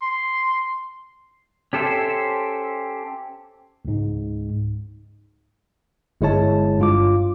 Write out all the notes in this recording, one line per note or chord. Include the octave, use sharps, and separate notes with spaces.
C6
C#4 G4 A4 C5 E5
C#2 G#2
G1 G#3 E4 C#5 A5
G2 F4 D6